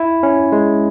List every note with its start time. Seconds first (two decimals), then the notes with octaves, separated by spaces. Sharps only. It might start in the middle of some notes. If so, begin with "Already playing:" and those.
Already playing: E4
0.23 C#4
0.52 G#3